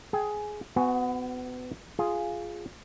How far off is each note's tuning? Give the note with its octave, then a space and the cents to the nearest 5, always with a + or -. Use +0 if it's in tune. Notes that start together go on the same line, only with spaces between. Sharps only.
G#4 +15 G5 +0
B3 +30 F#4 +0 G#5 +0
F4 +0 G#4 +0